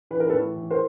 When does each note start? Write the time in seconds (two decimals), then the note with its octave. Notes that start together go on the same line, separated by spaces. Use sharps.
0.11 E3 B4
0.20 A#4
0.29 A4 B4
0.33 A2
0.56 E3
0.70 A#4 C5